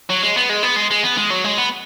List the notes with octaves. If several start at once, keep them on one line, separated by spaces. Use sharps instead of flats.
F#3
G#3
B3
G#3
B3
G#3
G#3
B3
G#3
F#3
G#3
B3